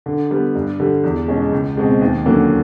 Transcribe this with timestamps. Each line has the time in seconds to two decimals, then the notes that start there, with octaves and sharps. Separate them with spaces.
0.06 D3
0.31 G3 B3
0.55 G2
0.80 D3 G3
1.04 E2
1.28 B2 G#3 C#4
1.52 C#2
1.77 B2 G#3 C4
2.01 D#2
2.26 D3 F#3 A#3 C#4